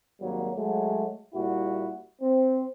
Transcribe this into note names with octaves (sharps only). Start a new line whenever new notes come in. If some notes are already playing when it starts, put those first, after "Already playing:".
G#1 F#3 G3 A#3
F#3 G#3 A3
A#2 G3 E4 F#4
C4